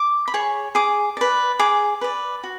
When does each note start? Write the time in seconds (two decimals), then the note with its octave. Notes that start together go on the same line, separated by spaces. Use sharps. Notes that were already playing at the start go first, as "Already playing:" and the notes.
Already playing: D6
0.28 B5
0.34 G#4 C#5 C#6
0.75 G#4 D6
1.17 B4 D5
1.59 G#4 D6
2.01 B4 D5
2.44 F#4